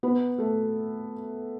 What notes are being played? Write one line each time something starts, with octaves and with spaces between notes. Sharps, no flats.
B3 B4
A3 A4